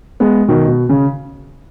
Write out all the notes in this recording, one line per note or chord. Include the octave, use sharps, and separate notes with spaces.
G#3 B3
B2 D#3
B2
C#3